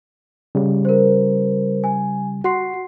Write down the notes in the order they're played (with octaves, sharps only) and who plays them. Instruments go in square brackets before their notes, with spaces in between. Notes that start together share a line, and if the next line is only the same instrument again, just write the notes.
[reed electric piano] C#3 G3
[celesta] A#4 C5
G#5
[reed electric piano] F#4 [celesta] F#5 C6 C7